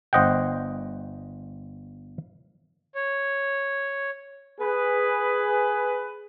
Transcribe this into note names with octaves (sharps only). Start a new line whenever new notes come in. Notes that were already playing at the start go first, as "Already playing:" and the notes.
G1 C5 D#5 F#5 G5
C#5
G#4 B4